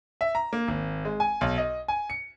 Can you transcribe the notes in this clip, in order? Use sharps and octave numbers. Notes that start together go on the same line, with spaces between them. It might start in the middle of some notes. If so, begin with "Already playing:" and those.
E5
A#5
A#3
G#1
G#3
G#5
B1
D#5
G#5
C#7